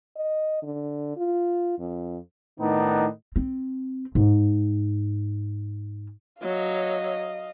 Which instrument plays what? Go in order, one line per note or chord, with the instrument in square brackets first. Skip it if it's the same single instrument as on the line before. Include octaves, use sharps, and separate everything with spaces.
[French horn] D#5
D3
F4
F2
[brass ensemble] A2 D#3 B3 D4 D#4
[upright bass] C4
G#2
[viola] F#3 C#5 [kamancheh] D#5 F5